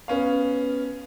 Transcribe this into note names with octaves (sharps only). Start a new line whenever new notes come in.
B3 C#4 F5